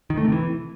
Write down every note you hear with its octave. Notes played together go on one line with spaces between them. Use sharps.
D#3
A3
C3
E3